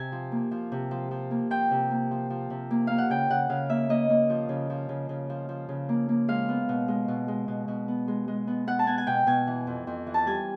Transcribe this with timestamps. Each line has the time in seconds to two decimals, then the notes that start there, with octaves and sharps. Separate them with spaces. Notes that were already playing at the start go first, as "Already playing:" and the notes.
Already playing: C3 G#5
0.12 F3
0.32 A#3
0.51 F3
0.72 C3
0.91 F3
1.11 F3
1.31 A#3
1.50 F3 G5
1.71 C3
1.91 A#3
2.11 F3
2.30 F3
2.50 C3
2.71 A#3
2.87 A#3 F5
2.98 F#5
3.10 C#3 G5
3.30 C#3 F#5
3.49 C#3 F5
3.70 A#3 E5
3.89 A#3 D#5
4.10 A#3
4.30 F3
4.49 C#3
4.70 F3
4.89 C#3
5.09 C#3
5.30 F3
5.49 F3
5.69 C#3
5.89 A#3
6.09 A#3
6.28 G#3 F5
6.49 B3
6.69 B2
6.88 G#3
7.08 B2
7.28 G#3
7.48 B2
7.68 B2
7.88 B3
8.08 G#3
8.28 G#3
8.47 B3
8.67 B3 F#5
8.79 A5
8.87 B3 G#5
8.98 G#5
9.07 B2 G5
9.27 B2 G#5
9.47 E3
9.67 F2
9.87 F2
10.07 E3
10.14 A5
10.26 G3 G#5